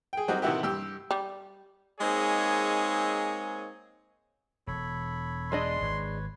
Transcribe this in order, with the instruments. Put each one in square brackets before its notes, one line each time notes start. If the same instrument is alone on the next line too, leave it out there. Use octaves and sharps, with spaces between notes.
[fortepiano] G#4 G5
F#3 G3 C4 D#4 F#4
C3 D#3 E3 E4 F#4 G4
G2 G4 E6
[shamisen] G3
[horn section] G#3 A#3 C4 D#4 G#4 C#5
[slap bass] E1 [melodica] A4 C#5 B5
[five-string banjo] G#3 D4 D#5 [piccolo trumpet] C6
[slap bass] G#1 [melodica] B4 C#5